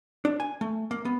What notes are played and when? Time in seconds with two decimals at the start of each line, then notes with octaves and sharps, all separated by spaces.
0.25 D4
0.40 G#5
0.61 A3
0.91 A#3
1.05 B3